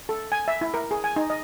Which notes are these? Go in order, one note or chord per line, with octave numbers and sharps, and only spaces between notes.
A4
G#5
E5
E4
A#4
G#4
G#5
D#4
D#5